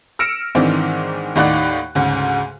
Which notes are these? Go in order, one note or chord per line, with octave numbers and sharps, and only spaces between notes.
E6 F6 A#6 C#7 D7 E7
G#2 D#3 E3 C4 D4 D#4
D#2 A2 D#4 D5 F#5 F#6
D2 G#2 C#3